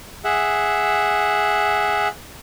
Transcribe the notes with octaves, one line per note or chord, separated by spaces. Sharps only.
G#4 E5 F#5